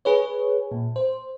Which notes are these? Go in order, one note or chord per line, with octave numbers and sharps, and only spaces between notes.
G#4 B4 C#5
A#2
C5